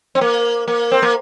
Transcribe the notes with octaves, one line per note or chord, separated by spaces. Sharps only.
C4
A#3
A#3
C4
A#3